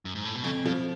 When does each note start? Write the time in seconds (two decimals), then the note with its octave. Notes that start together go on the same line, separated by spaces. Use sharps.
0.05 F#2
0.15 G#2
0.25 A2
0.35 B2
0.44 F2 C#3
0.65 B2 F3